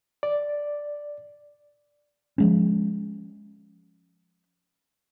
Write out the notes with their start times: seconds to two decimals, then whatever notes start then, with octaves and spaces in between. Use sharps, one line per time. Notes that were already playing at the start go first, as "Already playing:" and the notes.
0.23 D5
2.38 F3 G#3 C#4